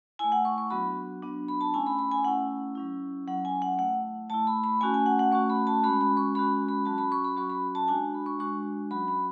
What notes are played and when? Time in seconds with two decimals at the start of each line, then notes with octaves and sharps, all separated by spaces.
0.19 A3 E4 G#5
0.32 F#5
0.45 C#6
0.58 C#6
0.70 F#3 B3 D4 F#4 B5
1.23 F#3 B3 D4 F#4
1.48 B5
1.61 A5
1.73 A3 C#4 E4 G#5
1.86 B5
1.99 B5
2.11 G#5
2.24 A3 C#4 E4 F#5
2.75 F#3 C#4 E4
3.27 F#3 C#4 E4 F#5
3.45 G#5
3.62 F#5
3.78 A3 E4 F#5
4.30 A3 E4 A5
4.47 B5
4.64 B5
4.81 A3 C#4 F#4 G#5
4.94 G#5
5.06 F#5
5.19 F#5
5.32 A3 C#4 F#4 C#6
5.50 B5
5.67 A5
5.83 G#3 C#4 F#4 B5
6.01 B5
6.17 C#6
6.35 G#3 C#4 F#4 B5
6.69 B5
6.85 F#3 C#4 F#4 A5
6.98 B5
7.12 C#6
7.24 B5
7.36 F#3 C#4 F#4 C#6
7.50 B5
7.75 A5
7.88 G#3 D4 F#4 G#5
8.14 B5
8.26 C#6
8.39 G#3 D4 F#4 C#6
8.91 F#3 C#4 F#4 B5
9.08 B5